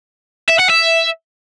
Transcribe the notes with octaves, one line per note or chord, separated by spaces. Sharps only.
E5
F#5
E5